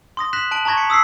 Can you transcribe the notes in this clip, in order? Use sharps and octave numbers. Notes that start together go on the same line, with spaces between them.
C6 D#6 A#6
F#6 A#6 B6 E7 F#7
A5 F#6 D7 F#7
A5 A#5 C#6 G#6 A#6
A#5 B6 C#7
D#6 E6 B6 C7